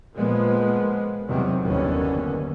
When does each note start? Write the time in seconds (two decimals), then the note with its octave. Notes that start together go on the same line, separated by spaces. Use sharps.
0.14 A#2 F3 G#3 A#3 B3
1.28 E2 C3 D#3 F#3 G3 C4
1.63 F#1 D#2 D3 E3 B3 C#4